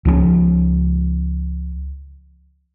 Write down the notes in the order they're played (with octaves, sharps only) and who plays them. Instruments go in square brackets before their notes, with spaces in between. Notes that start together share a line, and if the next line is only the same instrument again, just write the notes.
[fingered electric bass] C#2 F3 G#3 C#4